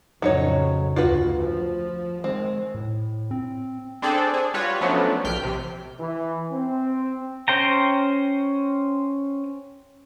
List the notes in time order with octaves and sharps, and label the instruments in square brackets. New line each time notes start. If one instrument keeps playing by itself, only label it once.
[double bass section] F2 A2 C#3 [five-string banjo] F#3 D#4 C#5
[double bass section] G1 D2 [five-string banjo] F4 F#4 B4
[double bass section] F3
[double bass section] D#3 G#3 [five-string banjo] C4
[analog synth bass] A2
C4
[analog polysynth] C4 D4 G#4 A4
D4 G#4
G3 F4 F#4 B4 C#5
F3 F#3 A3 B3 C#4 D4
A#1 G5 F6 G6 B6
C3
[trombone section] E3
C4
[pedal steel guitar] C#4 C5 G5 A#5